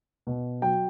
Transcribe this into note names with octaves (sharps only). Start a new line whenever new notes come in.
B2
F#3 G5